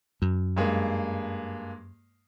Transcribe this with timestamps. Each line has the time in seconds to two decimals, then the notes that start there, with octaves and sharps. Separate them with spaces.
0.22 F#2
0.57 G2 G#3 A#3